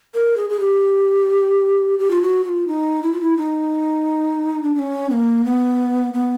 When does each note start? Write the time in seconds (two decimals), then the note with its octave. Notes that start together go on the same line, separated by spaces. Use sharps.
0.14 A#4
0.37 G#4
0.50 G#4
0.60 G4
1.99 G4
2.10 F4
2.22 F#4
2.44 F#4
2.49 F4
2.67 D#4
3.03 E4
3.12 F4
3.21 E4
3.37 D#4
4.63 D4
4.75 D4
4.79 C#4
5.10 B3
5.13 A#3
5.45 B3
6.14 B3